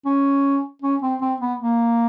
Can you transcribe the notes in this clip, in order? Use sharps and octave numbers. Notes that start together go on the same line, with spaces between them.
C#4
C#4
C4
C4
B3
A#3